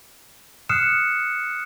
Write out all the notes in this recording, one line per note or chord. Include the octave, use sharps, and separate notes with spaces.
D#6 F6 F#6 C7 C#7 E7